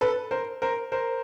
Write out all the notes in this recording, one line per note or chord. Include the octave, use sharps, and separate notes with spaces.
A4 B4
A#4 C5
A#4 C5
A#4 C5